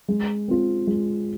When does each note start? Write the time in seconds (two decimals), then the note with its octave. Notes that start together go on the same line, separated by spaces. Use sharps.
0.08 G#3
0.48 C4 F4
0.87 G#3